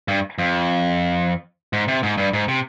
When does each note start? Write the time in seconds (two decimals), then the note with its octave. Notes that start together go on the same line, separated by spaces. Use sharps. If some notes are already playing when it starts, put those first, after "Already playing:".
0.08 G2
0.38 F2
1.73 G#2
1.88 C3
2.03 G#2
2.17 G2
2.33 G#2
2.48 C3